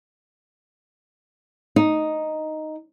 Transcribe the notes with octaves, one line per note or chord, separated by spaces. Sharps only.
D#4